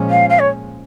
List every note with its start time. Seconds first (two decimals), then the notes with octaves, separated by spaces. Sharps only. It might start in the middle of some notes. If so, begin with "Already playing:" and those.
Already playing: A#2 F3 G#3 C#4
0.10 F5
0.29 F5
0.39 C#5